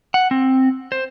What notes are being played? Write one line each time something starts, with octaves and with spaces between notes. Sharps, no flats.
F#5
C4
C5